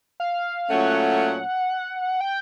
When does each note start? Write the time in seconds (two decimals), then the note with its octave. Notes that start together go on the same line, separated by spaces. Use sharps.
0.20 F5
0.70 A#2 F#3 A3 C#4 F#5
2.21 G5